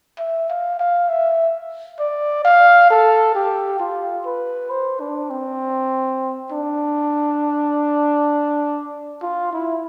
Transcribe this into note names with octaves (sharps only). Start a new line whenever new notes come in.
E5
F5
F5
E5
D5
F5
A4
G4
F4
B4
C5
D4
C4
D4
F4
E4